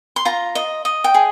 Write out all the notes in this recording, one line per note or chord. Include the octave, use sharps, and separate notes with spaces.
C6
F4 A#5
D#5
D#5
G5
G#4